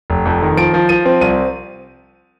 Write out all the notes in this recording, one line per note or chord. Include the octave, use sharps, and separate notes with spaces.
F1
F2
D#3
F3 D7
F3
F3 D#7
C4
C2 D#7